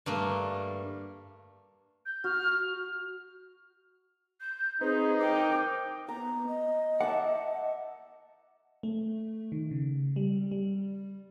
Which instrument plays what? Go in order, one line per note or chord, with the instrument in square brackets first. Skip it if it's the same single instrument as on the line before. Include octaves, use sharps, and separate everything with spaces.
[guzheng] G2 A3 A#3
[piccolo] G6
[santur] F#4 [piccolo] F6
[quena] G6
[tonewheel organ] C4 B4 C5 [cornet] D#4 [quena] G#4
[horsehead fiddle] A#4 G5 [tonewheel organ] C5 [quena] D6
[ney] B3 [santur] A#5
[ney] D#5
[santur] E5 A5 D6 [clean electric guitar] F#5
[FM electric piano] A3
D#3
C#3
G3
G3